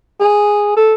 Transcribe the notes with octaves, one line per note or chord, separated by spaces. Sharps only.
G#4
A4